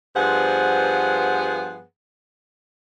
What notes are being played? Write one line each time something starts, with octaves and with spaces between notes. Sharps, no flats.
G2 F3 B3 G#4 C5 F#5